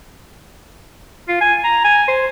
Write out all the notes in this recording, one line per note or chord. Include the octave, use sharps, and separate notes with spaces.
F4
G#5
A#5
G#5
C5